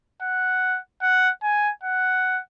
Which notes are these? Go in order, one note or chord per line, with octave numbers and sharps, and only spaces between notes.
F#5
F#5
G#5
F#5